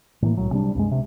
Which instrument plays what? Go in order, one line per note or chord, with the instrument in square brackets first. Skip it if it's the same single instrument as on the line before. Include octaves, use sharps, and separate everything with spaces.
[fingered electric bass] A2 E3 A#3
C2 A2 F#3
C3 G3 D4
C#2 G2 G#3
C3